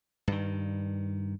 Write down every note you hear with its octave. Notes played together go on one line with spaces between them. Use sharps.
G2 D#3